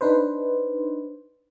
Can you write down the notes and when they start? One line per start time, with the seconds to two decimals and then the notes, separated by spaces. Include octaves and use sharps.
0.01 D4 D#4 B4 C5